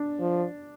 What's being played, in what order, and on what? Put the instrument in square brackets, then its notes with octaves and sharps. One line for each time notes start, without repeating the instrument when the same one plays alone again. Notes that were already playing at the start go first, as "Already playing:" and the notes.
Already playing: [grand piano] D4
[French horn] F3